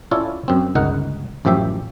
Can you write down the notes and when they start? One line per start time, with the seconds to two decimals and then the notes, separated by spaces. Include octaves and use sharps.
0.11 C#4 E4 F4 A4 C#5 D5
0.48 F#2 C4
0.75 G1 C#2 D#4 A#4 F#5
1.45 A1 F#2 F3 G4 E5